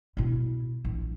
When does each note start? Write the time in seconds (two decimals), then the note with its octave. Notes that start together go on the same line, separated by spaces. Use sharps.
0.17 B2 E4
0.85 A#1 E3